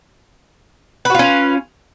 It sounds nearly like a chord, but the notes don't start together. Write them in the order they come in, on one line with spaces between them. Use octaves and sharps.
B4 F#4 F4 C#4